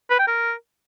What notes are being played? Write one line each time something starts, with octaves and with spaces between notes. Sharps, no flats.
B4
G5
A#4